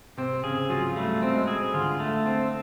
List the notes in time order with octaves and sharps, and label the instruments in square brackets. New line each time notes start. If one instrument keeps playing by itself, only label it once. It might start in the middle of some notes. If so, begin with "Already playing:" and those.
[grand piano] C3 [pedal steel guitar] C4
[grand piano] C#3 [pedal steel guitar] G#4
[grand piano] F#3 [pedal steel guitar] F4
[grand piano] G3 [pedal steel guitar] A3
[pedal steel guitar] C4
[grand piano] G#3
[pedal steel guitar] G#4
[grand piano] D3 [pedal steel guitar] F4
[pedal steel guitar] A3
C4